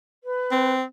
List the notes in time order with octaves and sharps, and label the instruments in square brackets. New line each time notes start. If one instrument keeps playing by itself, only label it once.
[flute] B4
[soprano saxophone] C4